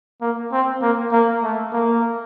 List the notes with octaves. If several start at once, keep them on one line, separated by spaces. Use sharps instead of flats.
A#3
C4
A#3
A#3
A3
A#3